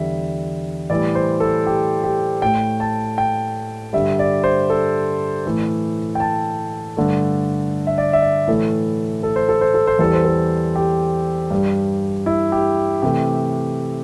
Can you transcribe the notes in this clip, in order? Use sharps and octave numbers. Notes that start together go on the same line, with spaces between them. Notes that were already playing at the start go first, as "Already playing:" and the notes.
Already playing: E2 D3 G3 E5
A2 E3 G3 D5
C5
A4
G4
G4
A2 A3 G5
A5
G5
G2 D3 G3 E5
D5
C5
A4
A2 E3 A3
G5
A5
G2 D3 A3
E5
D5
E5
D5
A2 E3 A3 A4
A4
C5
A4
C5
A4
C5
E2 E3 G3 A4
C5
A4
G4
G2 G3
E4
G4
C3 E3 A3 G4